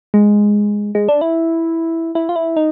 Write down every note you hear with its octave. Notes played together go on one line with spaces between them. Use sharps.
G#3
G#3
D4
E4
E4
F4
E4
D#4